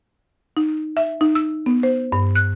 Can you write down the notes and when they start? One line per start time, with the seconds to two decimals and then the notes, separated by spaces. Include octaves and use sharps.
0.57 D#4
0.97 E5
1.21 D#4
1.35 E6
1.66 B3
1.83 C5
2.12 G2
2.36 F#6